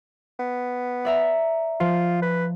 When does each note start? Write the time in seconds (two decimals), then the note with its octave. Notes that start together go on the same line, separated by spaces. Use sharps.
0.40 B3
1.05 D5 E5 A#5
1.80 F3 F4
2.22 B4